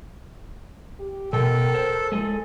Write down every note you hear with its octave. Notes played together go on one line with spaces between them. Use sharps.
G4
B2 A4 A#4 G5
C5
A2 G#3 G#4 A4